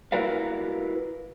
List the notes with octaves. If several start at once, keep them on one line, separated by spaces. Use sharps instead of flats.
E4 F#4 A#4 B4 F5